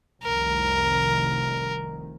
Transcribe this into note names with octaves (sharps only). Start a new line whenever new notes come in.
F1 C2 D#3 A#4